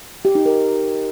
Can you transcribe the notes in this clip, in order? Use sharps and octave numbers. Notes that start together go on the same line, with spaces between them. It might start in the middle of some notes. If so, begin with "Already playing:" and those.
G4
D#4
A#4